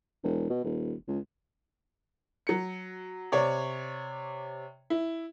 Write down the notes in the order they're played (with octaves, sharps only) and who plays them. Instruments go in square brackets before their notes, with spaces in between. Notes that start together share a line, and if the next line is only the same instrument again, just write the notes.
[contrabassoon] E1
B2
D#1
C#2
[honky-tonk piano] F#3 C#7
C3 C#5 D5
E4